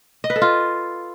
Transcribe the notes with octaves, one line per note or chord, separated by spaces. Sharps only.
D#5
B4
A4
F4